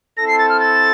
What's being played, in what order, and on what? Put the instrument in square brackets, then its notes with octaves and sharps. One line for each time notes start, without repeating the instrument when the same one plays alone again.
[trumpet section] C4 E4 A4 [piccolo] A#6
[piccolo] C7
A6
F6
A6